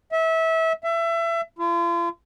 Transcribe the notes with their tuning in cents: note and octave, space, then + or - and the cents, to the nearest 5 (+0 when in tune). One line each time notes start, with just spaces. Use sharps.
E5 -25
E5 +25
F4 -40